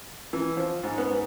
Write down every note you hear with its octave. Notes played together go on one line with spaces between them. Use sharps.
E3
F3
G#2
B3
G#2